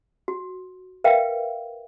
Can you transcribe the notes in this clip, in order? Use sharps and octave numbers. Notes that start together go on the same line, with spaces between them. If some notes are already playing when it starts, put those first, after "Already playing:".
F#4
A#4 B4 E5 F5 G5